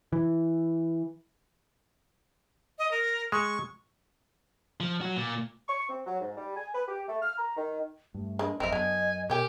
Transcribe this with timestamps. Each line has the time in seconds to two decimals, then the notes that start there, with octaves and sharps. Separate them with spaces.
0.13 E3
2.79 D#5
2.91 A#4
3.32 G#3 C#6
4.80 F3
5.01 F#3 F#4
5.17 A#2
5.69 C#6
5.89 C4
6.07 F#3
6.21 G#2
6.37 G3
6.56 G#5
6.74 B4
6.88 G4
7.08 A3
7.22 F6
7.38 A#5
7.57 D#3
8.14 G2 A3
8.39 G#3 A#3 D4 B4
8.60 F#1 F2 C4 A#4 B4 D#5 E5
8.72 F#2 B3 D4 G#5
9.30 B2 G4 A#4 C#5 G5 G#5